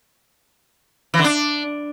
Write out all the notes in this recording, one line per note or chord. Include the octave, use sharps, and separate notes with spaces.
E3
D3
D4